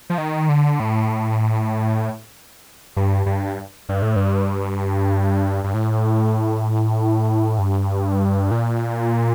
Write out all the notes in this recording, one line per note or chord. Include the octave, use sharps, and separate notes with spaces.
F3
D#3
D3
A2
G2
G2
G2
A2
G2
G2
A2
G2
A#2